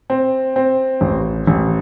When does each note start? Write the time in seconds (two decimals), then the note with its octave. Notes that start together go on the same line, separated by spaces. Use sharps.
0.10 C4
0.56 C4
1.01 A1
1.47 A1